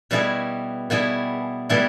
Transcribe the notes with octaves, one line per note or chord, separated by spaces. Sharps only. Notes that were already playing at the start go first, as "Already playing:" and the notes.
B2 G3 B3 E4 G#4
B2 G3 B3 E4 G#4
B2 G3 B3 E4 G#4